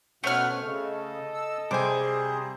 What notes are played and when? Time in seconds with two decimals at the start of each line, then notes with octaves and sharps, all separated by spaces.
0.24 B2 A3 C4 C#4 C#5 F#5 F6
0.62 C#3 A4 D#5
1.34 E6
1.71 C3 G3 G#4 C5 G#5 D6